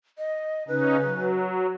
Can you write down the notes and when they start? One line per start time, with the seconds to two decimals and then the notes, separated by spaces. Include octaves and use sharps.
0.18 D#5
0.68 C#3 C#4 D#4 B4
1.03 F#3